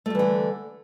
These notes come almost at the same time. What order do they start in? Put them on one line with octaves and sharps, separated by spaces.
A3 G3 E3 D3